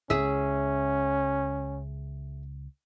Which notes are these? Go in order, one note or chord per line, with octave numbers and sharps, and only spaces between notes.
C#2 C#4 G#4 E5